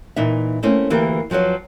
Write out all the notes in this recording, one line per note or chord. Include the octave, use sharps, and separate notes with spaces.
A#2 E3 D#4 E5
A3 A#3 C4 C#4 E4
D2 E3 A#3 G4 A#4
F2 F3 F#3 B4 C#5